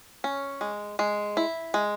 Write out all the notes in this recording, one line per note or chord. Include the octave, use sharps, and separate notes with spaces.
C#4
G#3
G#3
E4
G#3